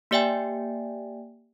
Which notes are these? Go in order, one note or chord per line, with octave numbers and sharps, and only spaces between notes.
A#3 G4 D5 E5 G5 G#5